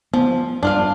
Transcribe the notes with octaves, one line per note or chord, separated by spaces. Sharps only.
F3 B3
G2 D4 F4 F5